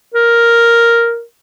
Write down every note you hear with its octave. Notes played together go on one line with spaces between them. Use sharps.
A#4